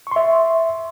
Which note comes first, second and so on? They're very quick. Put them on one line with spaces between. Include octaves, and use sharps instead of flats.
C#6 C6 E5